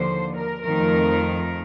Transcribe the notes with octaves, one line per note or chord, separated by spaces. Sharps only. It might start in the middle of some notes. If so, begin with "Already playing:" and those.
Already playing: D#2 D3 F3 C5
A#4
F2 D#3 A3 A#4